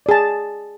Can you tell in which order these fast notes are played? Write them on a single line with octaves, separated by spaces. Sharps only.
D5 G#4 A5